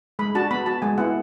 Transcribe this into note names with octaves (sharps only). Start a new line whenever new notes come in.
G#3 B5
D4 F#4 A5
B3 B5
F#4 A5
G#3 G#5
B3 E4 F#5